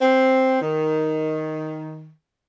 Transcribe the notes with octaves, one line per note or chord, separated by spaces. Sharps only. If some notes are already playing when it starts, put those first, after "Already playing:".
C4
D#3